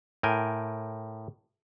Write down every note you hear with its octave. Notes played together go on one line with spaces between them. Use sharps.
A2 A#4 G5 G#5